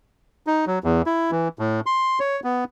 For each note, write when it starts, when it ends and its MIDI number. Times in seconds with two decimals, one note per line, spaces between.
0.47 0.65 63
0.67 0.79 54
0.84 1.02 40
1.06 1.31 64
1.31 1.48 52
1.59 1.80 45
1.86 2.19 84
2.20 2.40 73
2.44 2.64 59